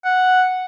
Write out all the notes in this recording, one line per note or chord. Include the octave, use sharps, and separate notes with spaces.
F#5